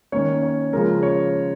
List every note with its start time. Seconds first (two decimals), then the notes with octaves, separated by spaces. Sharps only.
0.12 D#3 A#3 C#4 C#5
0.42 C#5
0.73 C#3 F3 G#3 A#4
1.03 C#5